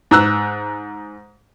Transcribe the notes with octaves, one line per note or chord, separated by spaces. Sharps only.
G#2 A#5 E6 F#6